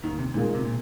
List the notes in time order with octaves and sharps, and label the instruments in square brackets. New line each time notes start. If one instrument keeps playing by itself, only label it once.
[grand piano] D#2 [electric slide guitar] D#3
[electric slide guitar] C3
[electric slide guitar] A#2 [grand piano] D#3 G#3 F4 A#4
[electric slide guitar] C3
A#2